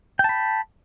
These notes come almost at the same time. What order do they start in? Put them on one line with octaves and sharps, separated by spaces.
G5 A5 B5